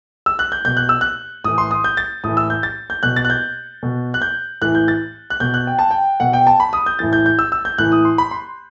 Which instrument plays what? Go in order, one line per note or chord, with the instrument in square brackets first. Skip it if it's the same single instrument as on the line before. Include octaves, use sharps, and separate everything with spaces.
[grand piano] E6
F#6
G6
B2 G6
F#6
E6
F#6
A2 E3 D#6
C6
D#6
G6
A6
A2 E3 D#6
E6
G6
A6
G6
B2 F#6
A6
F#6
G6
B2
F#6
G6
A2 E3 F#6
G6
A6
F#6
B2 G6
F#6
G5
A5
G5
B2 F#5
G5
A5
B5
D#6
G6
A2 E3 A6
G6
G6
E6
E6
G6
A2 E3 F#6
D#6
C6
B5
C6